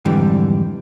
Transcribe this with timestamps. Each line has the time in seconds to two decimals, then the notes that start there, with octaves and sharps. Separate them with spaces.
0.05 F2 G#2 D3 E3 G3